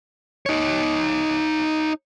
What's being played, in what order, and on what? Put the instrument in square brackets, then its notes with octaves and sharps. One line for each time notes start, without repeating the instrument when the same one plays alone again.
[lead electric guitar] D#4 C#5